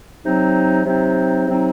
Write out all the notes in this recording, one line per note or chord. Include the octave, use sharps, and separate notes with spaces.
C3 F#3 C4 D#4
C3 F#3 C4 D#4
C3 F#3 C4 D#4